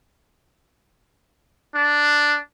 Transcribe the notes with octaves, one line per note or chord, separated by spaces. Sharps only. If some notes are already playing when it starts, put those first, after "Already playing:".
D4